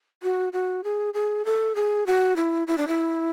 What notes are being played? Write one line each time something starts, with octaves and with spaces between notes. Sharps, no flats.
F#4
F#4
G#4
G#4
A4
G#4
F#4
E4
E4
D4
E4